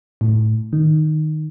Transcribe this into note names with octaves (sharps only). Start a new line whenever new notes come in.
A2
D#3